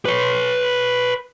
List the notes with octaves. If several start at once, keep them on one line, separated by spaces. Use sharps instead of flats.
B4 C#5